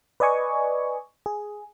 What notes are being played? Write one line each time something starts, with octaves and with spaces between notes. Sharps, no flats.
B4 D5 D#5 G#5 C#6
G#4